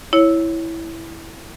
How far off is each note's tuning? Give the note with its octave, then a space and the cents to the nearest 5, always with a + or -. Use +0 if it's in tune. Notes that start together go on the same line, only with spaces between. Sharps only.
E4 +0 C#5 +0